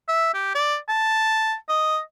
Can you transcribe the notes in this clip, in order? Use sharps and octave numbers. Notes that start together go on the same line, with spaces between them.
E5
G4
D5
A5
D#5